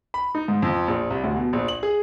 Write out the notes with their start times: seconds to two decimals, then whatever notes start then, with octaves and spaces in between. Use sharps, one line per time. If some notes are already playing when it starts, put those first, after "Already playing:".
0.14 B5
0.35 D#4
0.48 G#2
0.62 F2
0.88 A#1
1.10 C2
1.24 D2
1.36 B2
1.53 A#1
1.68 F#7
1.83 G#4